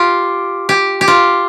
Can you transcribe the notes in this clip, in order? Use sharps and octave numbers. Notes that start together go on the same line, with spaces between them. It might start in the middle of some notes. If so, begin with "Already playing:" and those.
Already playing: F4 G4
G4
G4
F4